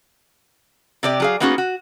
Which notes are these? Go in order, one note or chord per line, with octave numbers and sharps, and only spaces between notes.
C3 G4 D5
F#3 G#4 F5
A#3 B3 C#4 D#4 F#4 G#4
F#4